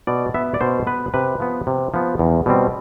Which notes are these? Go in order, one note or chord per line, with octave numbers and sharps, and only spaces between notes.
B2 D5
B3 E5
D5
B2 C5
B3 B4
C3 B4
F3 B3
C3
F3 B3
E2
B2 G3 C4